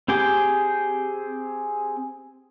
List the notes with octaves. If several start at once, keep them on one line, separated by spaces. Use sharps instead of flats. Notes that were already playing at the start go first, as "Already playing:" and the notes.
C4 G4 G#4 G5